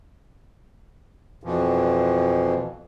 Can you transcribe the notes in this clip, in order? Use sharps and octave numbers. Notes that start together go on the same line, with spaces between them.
F2 B2 E3 F3